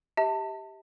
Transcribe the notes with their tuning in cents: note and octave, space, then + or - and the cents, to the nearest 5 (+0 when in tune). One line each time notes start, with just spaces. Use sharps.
G4 +0 E5 -40 A5 +25